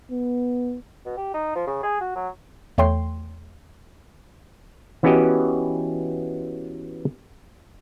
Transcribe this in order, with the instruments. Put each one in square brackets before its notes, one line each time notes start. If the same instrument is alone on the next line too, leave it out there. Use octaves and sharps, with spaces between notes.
[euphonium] B3
[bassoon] B2
G4
D#4
F3
C#3
G#4
F#4
F#3
[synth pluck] E2 A3 C#5 G5 C6 C7
[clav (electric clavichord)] E3 B3 C#4 F#4 G4 D#5